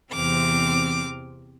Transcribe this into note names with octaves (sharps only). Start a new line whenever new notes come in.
E2 C3 C4 D6 F6